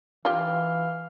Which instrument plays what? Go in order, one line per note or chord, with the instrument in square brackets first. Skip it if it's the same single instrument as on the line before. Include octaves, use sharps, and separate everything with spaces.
[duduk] E3 [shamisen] F4 G4 [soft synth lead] F5